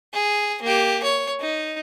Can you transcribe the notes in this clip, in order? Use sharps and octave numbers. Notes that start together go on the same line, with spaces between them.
G#4
A#3 G4
C#5
D#4